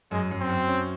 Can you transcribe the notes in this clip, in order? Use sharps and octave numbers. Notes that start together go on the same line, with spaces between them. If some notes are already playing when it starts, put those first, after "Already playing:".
F#2 G#3
F#2
C4
F#2
C#4